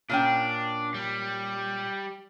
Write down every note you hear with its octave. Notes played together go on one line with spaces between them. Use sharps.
A#2 C#4 D4 G5
G3